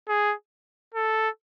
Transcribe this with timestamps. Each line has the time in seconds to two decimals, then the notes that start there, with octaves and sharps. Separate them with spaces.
0.09 G#4
0.94 A4